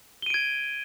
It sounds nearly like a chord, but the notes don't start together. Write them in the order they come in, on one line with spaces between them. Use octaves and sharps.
G7 D#7 D7 G#6